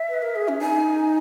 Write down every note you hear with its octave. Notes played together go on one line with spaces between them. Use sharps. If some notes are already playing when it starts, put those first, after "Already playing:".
Already playing: E5
B4
A#4
G#4
C#4
D#4 G#5